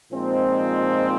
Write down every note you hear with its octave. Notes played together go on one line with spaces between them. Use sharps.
A#2 F3 G#3 C4 D#4